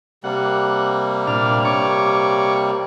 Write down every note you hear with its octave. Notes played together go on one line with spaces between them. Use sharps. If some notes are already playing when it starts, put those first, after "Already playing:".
C3 G3 A#3 F#5
A#2 D4 F6
C#5 C#6 D6